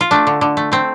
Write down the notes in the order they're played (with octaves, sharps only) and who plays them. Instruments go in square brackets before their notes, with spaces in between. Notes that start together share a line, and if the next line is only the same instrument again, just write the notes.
[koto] F4
A3 D4
D3
D3
A3
A3 C4